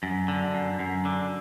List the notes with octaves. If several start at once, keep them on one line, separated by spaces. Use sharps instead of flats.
F#2
D3
F#2
F#2
D3